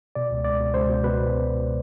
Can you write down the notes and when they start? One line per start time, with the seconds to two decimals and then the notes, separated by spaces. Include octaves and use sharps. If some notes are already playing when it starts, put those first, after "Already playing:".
0.15 B2 D5
0.31 C#2
0.44 C#2 D5
0.60 B2
0.74 C#2 C5
0.89 B2
1.03 B2 B4